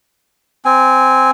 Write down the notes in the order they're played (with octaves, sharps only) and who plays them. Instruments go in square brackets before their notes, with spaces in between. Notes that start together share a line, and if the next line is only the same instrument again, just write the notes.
[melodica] C4 G#5